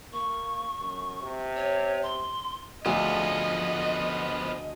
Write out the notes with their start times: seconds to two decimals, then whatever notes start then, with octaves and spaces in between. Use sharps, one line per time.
0.13 A#3 C#6
0.81 F#2
1.22 C3
1.56 C#5
2.03 C6
2.86 D2 F3 B3 F4 G#4 D#5 A5